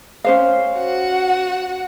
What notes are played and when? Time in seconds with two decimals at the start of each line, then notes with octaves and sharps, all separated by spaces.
0.24 C#4 C5 F5
0.80 F#4 F#5